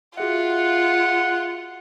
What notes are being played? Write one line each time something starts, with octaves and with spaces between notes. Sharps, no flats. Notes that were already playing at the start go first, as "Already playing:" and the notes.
F4 F#4 G#4 E5 F#5